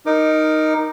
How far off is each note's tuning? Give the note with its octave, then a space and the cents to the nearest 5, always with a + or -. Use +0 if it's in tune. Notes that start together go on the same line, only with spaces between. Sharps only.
D#4 +0 A#4 +0 D6 +20